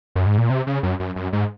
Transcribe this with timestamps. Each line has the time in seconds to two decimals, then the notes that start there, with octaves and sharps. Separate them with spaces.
0.15 F#2
0.26 G#2
0.38 A#2
0.50 C3
0.67 C#3
0.83 F#2
1.00 F#2
1.16 F#2
1.33 G#2